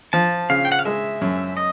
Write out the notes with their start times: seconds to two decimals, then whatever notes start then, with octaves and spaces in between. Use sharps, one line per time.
0.13 F3 A5
0.50 C#3 F5
0.65 G5
0.72 F#5
0.79 F5
0.85 G#3 E5
1.21 F#2
1.57 D#5